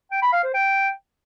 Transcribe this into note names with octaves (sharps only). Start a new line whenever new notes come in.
G5
B5
F5
C5
G5